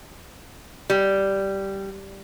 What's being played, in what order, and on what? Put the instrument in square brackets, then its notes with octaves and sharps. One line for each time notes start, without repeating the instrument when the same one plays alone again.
[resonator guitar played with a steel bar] G3